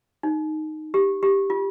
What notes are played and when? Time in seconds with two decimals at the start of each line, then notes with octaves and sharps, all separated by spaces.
0.23 D#4
0.94 G4
1.23 G4
1.50 F4